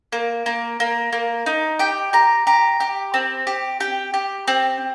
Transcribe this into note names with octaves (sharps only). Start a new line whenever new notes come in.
A#3
A#3
A#3
A#3
D#4
G4 G5
G4 A#5
G4 A#5
G4
C4
G4
G4 G5
G4
C4